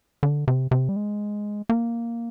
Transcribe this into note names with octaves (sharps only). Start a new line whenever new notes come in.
D3
C3
C3
G3
G#3
A#3